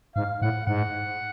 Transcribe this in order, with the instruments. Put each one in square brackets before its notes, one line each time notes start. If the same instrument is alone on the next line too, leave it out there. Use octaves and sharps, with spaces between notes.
[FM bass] G#2 [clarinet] F5
[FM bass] A2 [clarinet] F#5
[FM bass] G#2 [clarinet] F#5